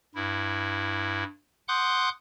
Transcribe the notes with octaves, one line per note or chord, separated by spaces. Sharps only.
G2 E4
F#5 C6 D6 D#6 F#6 G6